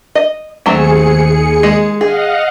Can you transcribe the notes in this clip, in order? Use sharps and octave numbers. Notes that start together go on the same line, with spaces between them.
D#5
D#2 F#3 A3 C4 G#4 C#7
G#3
G#4 D#5 F5 F#5